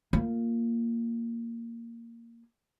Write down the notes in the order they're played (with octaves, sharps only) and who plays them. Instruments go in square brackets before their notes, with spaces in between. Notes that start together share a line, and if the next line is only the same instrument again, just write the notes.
[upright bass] A#3 F4